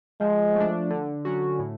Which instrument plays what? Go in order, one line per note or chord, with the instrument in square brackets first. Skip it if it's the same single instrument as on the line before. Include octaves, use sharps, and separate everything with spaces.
[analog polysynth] F3 [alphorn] G#3
[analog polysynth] A3 D4
D3
F#3 C#4 F#4
A2